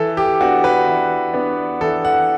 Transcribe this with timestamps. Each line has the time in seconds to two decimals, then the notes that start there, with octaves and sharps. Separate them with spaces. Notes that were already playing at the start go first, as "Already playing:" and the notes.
Already playing: E3 A4
0.17 G4
0.41 B3 D4 F#4
0.64 B4
0.87 E3
1.34 B3 D4
1.81 E3 A4
2.05 F#5